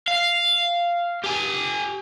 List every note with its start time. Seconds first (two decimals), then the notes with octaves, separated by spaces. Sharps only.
0.08 F5
1.24 G4 G#5